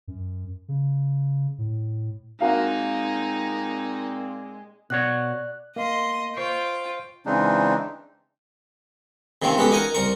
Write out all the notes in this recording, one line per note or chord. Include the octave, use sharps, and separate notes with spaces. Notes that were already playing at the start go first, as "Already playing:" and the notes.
F#2
C#3
A2
A#2 G#3 A#3 C4 D#4 F#4 A#4 F5
B2 F#4 C#5 D5 F#6
A#3 D#5 C6
F4 C5 G5 C#6 C7
C#3 E3 G#3 C4 D4 D#4
C3 D#3 A#3 C4 C#4
G#3 B3 C#4 F#4 G4 A4
D#4 A#4 D#5 F#5 G#5 A#5
C2 A#4 A#5 C#6